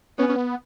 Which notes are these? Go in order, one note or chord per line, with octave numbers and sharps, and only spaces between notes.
B3 C#4
C#4
B3